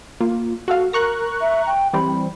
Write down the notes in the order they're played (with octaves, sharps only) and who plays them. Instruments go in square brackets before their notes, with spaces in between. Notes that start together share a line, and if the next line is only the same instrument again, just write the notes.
[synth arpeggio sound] A#3 F4
F#4 A4 F5
[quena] A#4 [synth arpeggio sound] A#5 C#6 F#6
[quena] E5
G5
[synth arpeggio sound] E3 G3 C4 [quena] B5